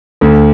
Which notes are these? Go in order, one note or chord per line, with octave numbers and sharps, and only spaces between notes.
D2